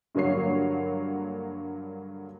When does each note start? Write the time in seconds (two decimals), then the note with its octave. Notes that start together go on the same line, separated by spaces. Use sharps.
0.15 G2 D3 F#3 A#3 C#5 C7